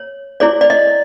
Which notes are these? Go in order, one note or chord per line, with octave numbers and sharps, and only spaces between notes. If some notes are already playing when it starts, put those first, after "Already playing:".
Already playing: C#5
E4 G#4 C#5 D5
D5
D#5